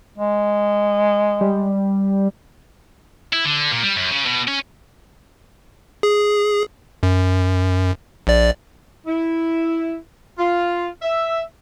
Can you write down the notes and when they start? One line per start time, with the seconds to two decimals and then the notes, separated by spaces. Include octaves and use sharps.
0.18 G#3
1.41 G3
3.33 E4
3.45 D3
3.72 A#2
3.83 G3
3.96 F#2
4.11 C#3
4.26 B2
4.48 C#4
6.03 G#4
7.03 F#2
8.27 A#1 D5
9.07 E4
10.39 F4
11.02 E5